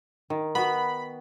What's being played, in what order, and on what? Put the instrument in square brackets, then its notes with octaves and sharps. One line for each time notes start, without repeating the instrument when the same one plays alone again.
[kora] D#3
[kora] B3 F#4 [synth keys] B5